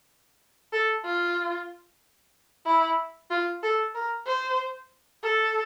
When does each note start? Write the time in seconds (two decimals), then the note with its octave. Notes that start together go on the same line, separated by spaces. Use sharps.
0.73 A4
1.05 F4
2.66 E4
3.30 F4
3.63 A4
3.95 A#4
4.27 C5
5.23 A4